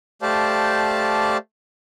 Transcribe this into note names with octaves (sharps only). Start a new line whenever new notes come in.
A3 G4 C5 D5 F5 A5